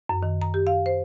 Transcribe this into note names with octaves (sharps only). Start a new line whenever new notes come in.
F#2
D#3
A#5
G4
F5
C5